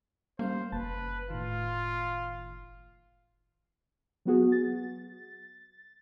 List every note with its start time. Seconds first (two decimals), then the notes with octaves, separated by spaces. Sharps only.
0.39 G3 A#3 C#4 C5 F5
0.72 F#1 B4 A5
1.30 A2 D#3 F4
4.25 F#3 B3 F#4 G#4
4.52 A6